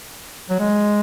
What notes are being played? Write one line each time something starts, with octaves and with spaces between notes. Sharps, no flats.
F#3
G#3